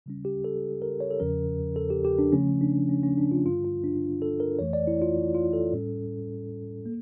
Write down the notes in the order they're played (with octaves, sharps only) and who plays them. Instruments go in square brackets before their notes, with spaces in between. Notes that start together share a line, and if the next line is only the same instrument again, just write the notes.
[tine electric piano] C#3 G3 C#4
G4
A4
A#4
C#5
A4
E2 C#3 F3 C#4 A#4
A4
G4
G4
D4
C#3 F3 A3 C#4
D4
C#4
C#4
D4
F4
G2 D3 G3 F4
F4
D4
A4
A#4
F2 E3 A3 C#5
D5
E4
F4
F4
A4
A2 G3 C#4
A#3